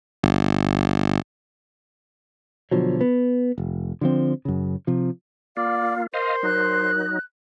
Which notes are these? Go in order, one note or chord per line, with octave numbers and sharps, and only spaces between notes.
G1
B2 D3 F3 F#3
B3
F1
D3 F3 C4
F#2 C#3
C3 F3
A#3 F4 D5 F5
A#4 C5 D#5 F5 C6
F#3 D#4 F#6